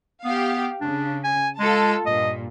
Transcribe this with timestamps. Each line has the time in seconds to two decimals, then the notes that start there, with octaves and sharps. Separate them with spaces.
0.24 B3 G4 F5
0.81 C#3 D4
1.24 G#5
1.59 G#3 F4 A4 A5
2.06 G2 A#2 D#5